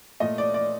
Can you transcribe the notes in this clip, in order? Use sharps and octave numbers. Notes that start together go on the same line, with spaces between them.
A#2 A3 D#5
D5
D5